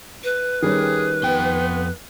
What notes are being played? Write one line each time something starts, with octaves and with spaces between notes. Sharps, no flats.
B4
D#3 G3 C#4 G#4
F2 B3 G5